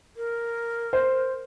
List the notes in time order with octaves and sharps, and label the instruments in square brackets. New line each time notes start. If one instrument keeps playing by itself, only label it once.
[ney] A#4
[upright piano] C5